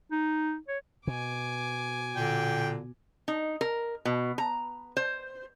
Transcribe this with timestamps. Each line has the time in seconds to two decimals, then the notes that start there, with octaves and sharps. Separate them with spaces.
0.11 D#4
0.68 C#5
1.07 B2 G#5 D6
2.16 A#2 D3 G5
3.28 D#4
3.61 A#4
4.05 B2
4.38 A#5
4.97 C5